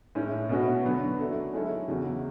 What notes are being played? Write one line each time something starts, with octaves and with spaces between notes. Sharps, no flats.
A2 G#3 C#4
B2 A3 C#4 F#4 B4
D3 F#3 B3
F#3 A3 D4 A4
G#3 C#4 E4 A4
E2 C#3 F#3